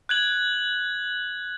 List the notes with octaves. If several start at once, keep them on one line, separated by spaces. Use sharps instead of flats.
F#6 G#6 F#7